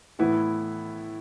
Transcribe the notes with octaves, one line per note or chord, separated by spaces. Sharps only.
A2 E3 B3 E4